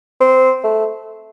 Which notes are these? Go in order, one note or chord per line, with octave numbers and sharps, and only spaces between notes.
C4
A3